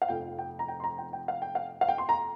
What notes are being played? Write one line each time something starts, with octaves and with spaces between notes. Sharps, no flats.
F5
F1 F2 F3 G5
G5
A#5
G5
C6
A#5
G5
G5
F5
G5
F5
F5
G5
C6
A#5